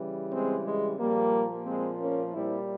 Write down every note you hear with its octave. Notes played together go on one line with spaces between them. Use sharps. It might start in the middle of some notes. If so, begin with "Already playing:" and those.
Already playing: C#3 E3 G3
G#3 C4
G#3
A#2 F3 G3 A#3
G#3 C4
A#3 C#4
A#2 G3 C4 E4